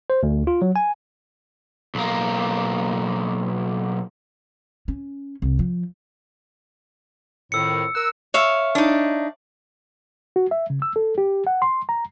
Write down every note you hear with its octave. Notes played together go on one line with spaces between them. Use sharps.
C5
D2
F4
F#3
G#5
B1 A#3
C#4
C2
F3
F2 A2 D#3 E6 C#7
A#4 E6 F#6
C#5 E5 F5
D4 D#4
F#4
E5
C#3
E6
A4
G4
F#5
C6
A#5